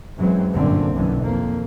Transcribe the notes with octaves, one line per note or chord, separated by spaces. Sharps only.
F#2 E3 F#3 G#3 C4
G1 F#2 A#2 D3 A#3 C4
B1 F#2 B2 D3 E3
F2 A#3